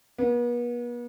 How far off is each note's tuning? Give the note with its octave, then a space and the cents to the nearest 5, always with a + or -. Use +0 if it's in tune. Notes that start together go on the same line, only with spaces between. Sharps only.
B3 -40